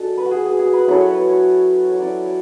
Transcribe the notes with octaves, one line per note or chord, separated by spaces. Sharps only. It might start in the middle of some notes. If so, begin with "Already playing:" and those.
Already playing: G#3 D4 F#4 A4
B4
F#4
G#4
G#4
G#4
B4
F#3 C#4 E4 A4
C#5
B4
C#5
C#5
F#3 C#4 E4 D5
C#5